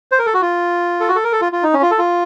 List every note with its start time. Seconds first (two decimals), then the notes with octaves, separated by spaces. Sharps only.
0.12 C5
0.19 A#4
0.26 A4
0.34 F#4
0.41 F4
1.00 A4
1.08 F#4
1.16 A4
1.24 A#4
1.32 A4
1.41 F4
1.52 F4
1.63 D#4
1.74 C#4
1.82 F4
1.91 A4
1.99 F4